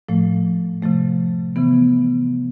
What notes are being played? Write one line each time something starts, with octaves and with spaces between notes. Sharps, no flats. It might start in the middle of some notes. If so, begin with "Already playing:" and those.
A2 F3 A3
C3 F3 A3
C3 E3 B3